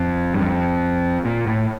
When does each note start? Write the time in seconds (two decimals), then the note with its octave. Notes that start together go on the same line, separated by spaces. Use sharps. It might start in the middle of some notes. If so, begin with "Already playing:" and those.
Already playing: F2
0.34 G2
0.41 F2
1.25 A#2
1.47 A2